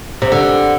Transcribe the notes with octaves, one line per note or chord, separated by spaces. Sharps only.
C3
D3